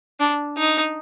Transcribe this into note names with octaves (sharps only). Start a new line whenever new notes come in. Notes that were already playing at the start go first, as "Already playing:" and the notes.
D4
D#4